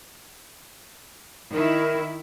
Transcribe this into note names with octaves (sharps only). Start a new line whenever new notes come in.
D#3 E4 A#4